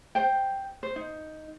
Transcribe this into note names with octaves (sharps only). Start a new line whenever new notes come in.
C5 G5
C5
D#4